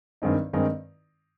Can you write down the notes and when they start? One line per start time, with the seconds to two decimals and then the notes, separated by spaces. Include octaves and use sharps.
0.22 G2 D#3 G#3 C4 D#4
0.53 G2 D#3 G#3 C4 D#4